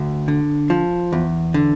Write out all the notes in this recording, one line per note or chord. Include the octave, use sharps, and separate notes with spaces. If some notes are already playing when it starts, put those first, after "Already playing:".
Already playing: D2
D3
F3
E2
D3